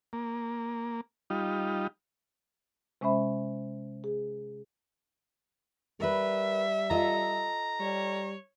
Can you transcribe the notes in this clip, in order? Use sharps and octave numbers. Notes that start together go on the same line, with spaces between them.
A#3
G3 D#4 F4
C3 G#3 C#4 C5 E5 B5
G#4
G3 A#4 B4 E5
F4 A4 D#5 A#5
G3 C#5